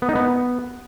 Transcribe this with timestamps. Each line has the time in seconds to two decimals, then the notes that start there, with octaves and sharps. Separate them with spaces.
0.02 B3
0.09 D#4
0.15 B3